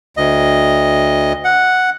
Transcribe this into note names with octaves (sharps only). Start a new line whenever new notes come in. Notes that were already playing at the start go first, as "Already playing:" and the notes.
D2 D#5
F#5